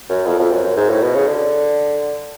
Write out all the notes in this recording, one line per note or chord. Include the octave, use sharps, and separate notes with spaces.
F#2
F2
F2
F#2
F#2
G#2
A2
B2
C#3
D3